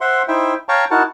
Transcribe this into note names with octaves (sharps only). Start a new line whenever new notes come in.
C5 E5 F#5 C6
D#4 E4 C5 E5 G5
C#5 F5 G5 A5 A#5 C#6
D#4 E4 F#4 A#4 F#5 A5